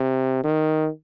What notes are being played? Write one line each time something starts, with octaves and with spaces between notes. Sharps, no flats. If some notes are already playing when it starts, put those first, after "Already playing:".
Already playing: C3
D#3